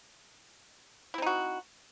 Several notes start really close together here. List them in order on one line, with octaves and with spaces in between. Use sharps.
E4 C4 D#4 F#4